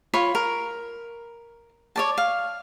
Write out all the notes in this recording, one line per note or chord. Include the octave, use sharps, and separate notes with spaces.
F4 C#5 B5
A#4
C#5 D5 A5
F5